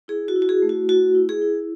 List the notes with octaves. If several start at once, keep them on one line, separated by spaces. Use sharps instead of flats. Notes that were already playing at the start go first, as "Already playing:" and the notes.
E4 G#4
F#4
E4
F#4
G#4
A3
F#4
E4 F#4
E4
G#4
E4